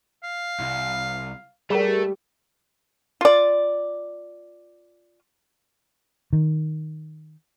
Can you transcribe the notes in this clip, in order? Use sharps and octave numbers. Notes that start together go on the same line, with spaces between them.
F5
C2
G3 A3 G#4 A#4
F4 D5
D#3